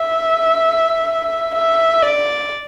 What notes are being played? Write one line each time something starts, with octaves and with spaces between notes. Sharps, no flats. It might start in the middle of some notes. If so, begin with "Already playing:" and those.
Already playing: E5
E5
D5